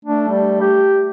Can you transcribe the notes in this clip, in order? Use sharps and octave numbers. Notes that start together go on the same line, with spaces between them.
A3 D4
G3
G4